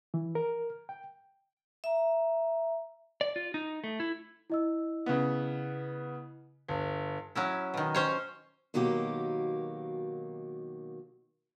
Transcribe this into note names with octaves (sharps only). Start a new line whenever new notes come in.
E3
A#4
G5
E5 A#5
D5
F4
D#4
A3
E4
E4 D#5 E6
C#3 B3
G1
F#3 C#4 E4
B2 D#3
C#4 C5 C#5
B2 D#3 F#3 A#3 G4